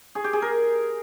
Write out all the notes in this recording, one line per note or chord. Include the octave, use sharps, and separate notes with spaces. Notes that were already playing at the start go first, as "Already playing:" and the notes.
G#4
G4
G#4
A#4